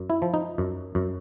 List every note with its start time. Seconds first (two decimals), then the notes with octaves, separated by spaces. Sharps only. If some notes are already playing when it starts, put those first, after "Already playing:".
Already playing: F#2
0.10 E4
0.22 F3
0.34 D#4
0.58 F#2
0.95 F#2